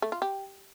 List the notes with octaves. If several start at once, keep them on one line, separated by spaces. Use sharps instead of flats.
A3
F4
G4